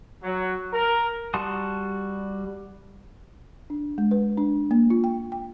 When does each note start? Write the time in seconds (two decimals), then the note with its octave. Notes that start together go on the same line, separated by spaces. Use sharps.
0.23 F#3
0.73 A#4
1.34 G3 F#4 A5 C6 D#6
3.70 D4
3.98 G#3
4.11 B4
4.37 D4
4.71 A#3
4.90 F4
5.04 G5
5.32 G5